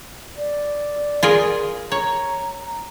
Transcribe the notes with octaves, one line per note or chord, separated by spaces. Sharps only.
D5
F4 G#4 A#4
C#5 A#5